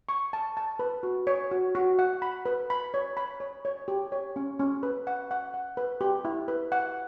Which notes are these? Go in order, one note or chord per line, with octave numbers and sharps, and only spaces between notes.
C#6
A5
A5
B4
F#4
C#5
F#4
F#4
F#5
B5
B4
B5
C#5
B5
C#5
C#5
G4
C#5
C#4
C#4
B4
F#5
F#5
F#5
B4
G4
E4
B4
F#5